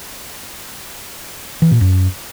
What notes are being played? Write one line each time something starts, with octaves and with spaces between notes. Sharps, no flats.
E3
A#2
F#2